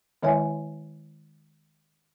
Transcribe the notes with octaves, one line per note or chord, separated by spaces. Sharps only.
D#3 G#3 E4 C#5 E5 G#5